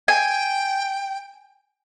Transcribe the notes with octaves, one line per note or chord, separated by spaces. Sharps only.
G5 G#5